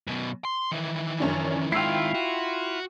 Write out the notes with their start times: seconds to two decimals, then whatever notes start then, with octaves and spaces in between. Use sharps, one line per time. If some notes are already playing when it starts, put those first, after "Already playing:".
0.07 F#2 B2
0.45 C6
0.72 D#3 E3
1.20 F#2 C#4 D4
1.72 G#2 D#3 E4 F4 G5 E6 C7
2.14 F#4